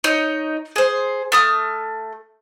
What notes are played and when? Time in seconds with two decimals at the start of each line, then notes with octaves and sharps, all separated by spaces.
0.04 D#4 C#5
0.76 G#4 C5
1.32 A3 D#6 F6